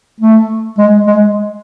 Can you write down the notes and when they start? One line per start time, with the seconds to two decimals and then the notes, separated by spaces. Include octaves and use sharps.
0.20 A3
0.78 G#3
1.07 G#3